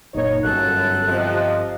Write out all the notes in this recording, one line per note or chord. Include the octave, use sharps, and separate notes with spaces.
F#1 A#2 D#4 C#5
G1 F#2 A4 F#6
C3 F3 D#5